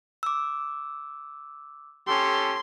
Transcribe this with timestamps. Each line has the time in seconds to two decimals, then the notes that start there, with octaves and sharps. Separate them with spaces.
0.23 D6 E6
2.07 C#4 G4 A4 C6